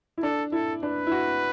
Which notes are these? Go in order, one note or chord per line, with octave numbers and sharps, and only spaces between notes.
E4
D4 A4
E4 A4
D4 B4
E4
F#4